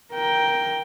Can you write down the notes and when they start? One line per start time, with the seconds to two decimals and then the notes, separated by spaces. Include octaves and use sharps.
0.13 A#4 G5